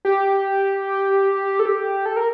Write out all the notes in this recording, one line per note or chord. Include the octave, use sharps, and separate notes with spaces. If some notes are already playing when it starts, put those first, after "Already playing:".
G4
A4
G4
A4
A#4